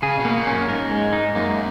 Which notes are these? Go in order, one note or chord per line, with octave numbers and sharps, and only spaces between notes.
C#3 G#4
B2
A#3
A#2
F#2 C#4
G#2 A#4
G#3
D#4
F#2 A#3